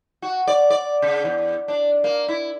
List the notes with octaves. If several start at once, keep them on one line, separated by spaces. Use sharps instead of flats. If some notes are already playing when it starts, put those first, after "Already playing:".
F#4
D5
D5
C#3
E2
D4
A#3
E4